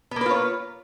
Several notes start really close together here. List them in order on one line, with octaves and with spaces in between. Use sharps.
B3 A#3 B4 F4 C#5